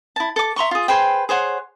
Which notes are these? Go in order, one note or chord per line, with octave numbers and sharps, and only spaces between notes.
E4 A5
A4 D6
E5 A#5 C6 C#6
F4 G#4
G#4 B4 C5 G5
G#4 C5 C#5 F#5